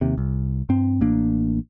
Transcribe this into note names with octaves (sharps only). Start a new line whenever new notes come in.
D#2 C3
C2
G2 C4
A1 A#3 D4